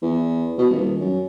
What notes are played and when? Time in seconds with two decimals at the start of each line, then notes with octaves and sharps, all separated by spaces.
0.02 E2
0.58 B2
0.70 D#1
1.01 F#2